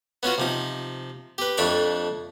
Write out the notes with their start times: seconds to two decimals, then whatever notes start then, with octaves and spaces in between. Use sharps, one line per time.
0.23 B3 C#4 F4 F#4
0.38 C3 F3 D#4
1.38 G4 B4
1.57 F2 A3 D4 C#5 B5 D6